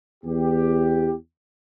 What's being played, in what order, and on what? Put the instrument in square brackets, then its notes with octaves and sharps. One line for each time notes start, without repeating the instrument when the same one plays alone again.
[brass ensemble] E2 G4